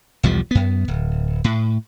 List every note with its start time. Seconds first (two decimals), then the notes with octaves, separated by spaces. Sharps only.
0.23 B1 E2 F3 G3
0.51 F#2 B3
0.88 D1
1.44 A2